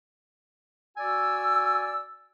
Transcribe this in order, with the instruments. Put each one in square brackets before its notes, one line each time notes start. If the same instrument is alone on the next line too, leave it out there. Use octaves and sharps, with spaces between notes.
[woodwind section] F#4 D5 G#5 E6